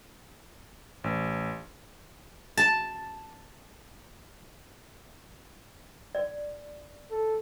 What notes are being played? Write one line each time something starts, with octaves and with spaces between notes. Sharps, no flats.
A1
A5
D5
A4